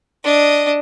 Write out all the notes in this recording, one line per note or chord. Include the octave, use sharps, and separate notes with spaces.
D4 D#5